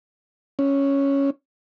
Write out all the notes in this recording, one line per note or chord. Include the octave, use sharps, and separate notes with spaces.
C#4